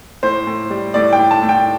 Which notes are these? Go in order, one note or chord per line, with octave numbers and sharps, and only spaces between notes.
A2 C5
A2
G3
A2 D5
G5
A2
A5
A2
G5